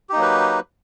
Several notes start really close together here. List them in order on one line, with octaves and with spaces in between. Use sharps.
G4 D#4 A#3 F#3 B4